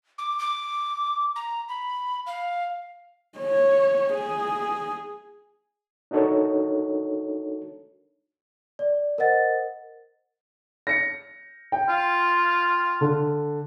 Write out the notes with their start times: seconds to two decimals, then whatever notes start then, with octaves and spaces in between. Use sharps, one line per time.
0.18 D6
0.39 D6
1.36 A#5
1.69 B5
2.26 F5
3.39 C#5
4.13 G#4
6.11 D4 D#4 F#4 A4 A#4 C#5
8.79 D5
9.18 A#4 C5 D#5 F#5 A6
10.87 A#6 C#7
11.72 G5
11.88 F4
13.01 D3